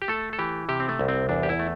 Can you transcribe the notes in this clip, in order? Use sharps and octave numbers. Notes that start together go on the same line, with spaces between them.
G4
A3 A4
A4
E3 G4
C3 G4
C4
A3
C2
C4
E2 D4
G4
E4
A3